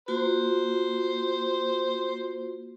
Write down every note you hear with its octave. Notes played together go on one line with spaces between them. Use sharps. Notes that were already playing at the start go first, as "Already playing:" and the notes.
A#3 F4 F#4 C5